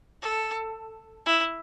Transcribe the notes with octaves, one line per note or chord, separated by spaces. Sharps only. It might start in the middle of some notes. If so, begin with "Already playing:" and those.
A4
E4